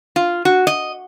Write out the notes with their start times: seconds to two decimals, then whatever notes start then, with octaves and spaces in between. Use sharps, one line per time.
0.16 F4
0.45 F#4
0.67 D#5